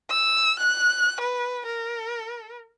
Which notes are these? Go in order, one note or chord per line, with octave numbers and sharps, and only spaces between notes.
E6
F#6
B4
A#4